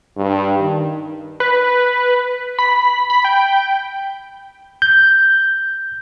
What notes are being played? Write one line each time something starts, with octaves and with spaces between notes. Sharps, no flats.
G2
D#3
B4
B5
B5
G5
G6